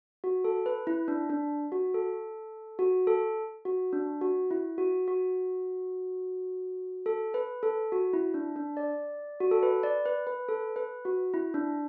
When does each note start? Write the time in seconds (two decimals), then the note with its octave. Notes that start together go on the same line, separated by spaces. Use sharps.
0.24 F#4
0.44 A4
0.66 B4
0.87 E4
1.08 D4
1.30 D4
1.72 F#4
1.94 A4
2.79 F#4
3.07 A4
3.65 F#4
3.93 D4
4.21 F#4
4.51 E4
4.78 F#4
5.08 F#4
7.06 A4
7.34 B4
7.63 A4
7.92 F#4
8.13 E4
8.34 D4
8.56 D4
8.77 D5
9.40 F#4
9.51 A4
9.63 B4
9.83 D5
10.06 B4
10.27 B4
10.48 A4
10.76 B4
11.05 F#4
11.34 E4
11.54 D4